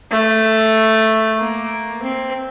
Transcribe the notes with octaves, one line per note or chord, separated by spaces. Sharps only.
A3
A#3
C4